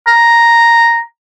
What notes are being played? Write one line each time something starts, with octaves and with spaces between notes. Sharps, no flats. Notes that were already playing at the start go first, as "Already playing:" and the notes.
A#5